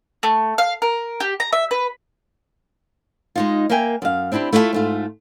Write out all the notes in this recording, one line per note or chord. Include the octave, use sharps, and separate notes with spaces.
A3
F5
A#4
G4
A#5
E5
B4
G#3 D#4 F4
A#3 A#4 E5 G5 G#5
F#2 F5
C4 D4 E4 F4 G4
A3 E4 F4 D5 A5
G#2 A3 F4